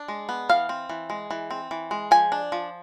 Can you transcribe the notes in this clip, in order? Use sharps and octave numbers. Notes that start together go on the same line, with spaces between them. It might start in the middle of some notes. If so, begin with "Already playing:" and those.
Already playing: D4
G#3
B3
E3 F5
C4
E3
G#3
E3
C4
E3
G#3
F3 G#5
D4
F3